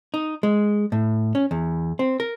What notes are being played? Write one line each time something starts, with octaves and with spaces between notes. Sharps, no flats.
D#4
G#3
A2
C#4
E2
C4
A#4